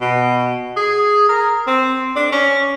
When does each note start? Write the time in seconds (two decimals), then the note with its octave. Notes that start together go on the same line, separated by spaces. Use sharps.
0.01 B2
0.76 G#4
1.29 A#4
1.67 C4
2.16 D4
2.32 C#4